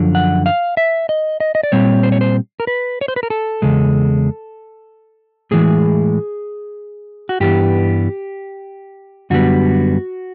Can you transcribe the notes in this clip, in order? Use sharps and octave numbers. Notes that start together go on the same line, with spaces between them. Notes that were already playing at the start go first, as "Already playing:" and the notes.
Already playing: F#2 D3 F3
F#5
F5
E5
D#5
D#5
D#5
D5
A#2 G3 C4 C#5
C5
C#5
C5
A#4
B4
C#5
C5
B4
A#4
A4
E2 C#3 G#3
A2 E3 G#3 G#4
F#4
G2 E3 G3 B3 G4
F#2 D3 G3 B3 F#4